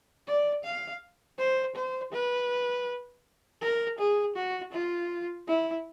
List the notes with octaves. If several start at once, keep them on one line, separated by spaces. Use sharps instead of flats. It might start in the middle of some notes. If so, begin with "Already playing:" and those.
D5
F5
C5
C5
B4
A#4
G#4
F#4
F4
E4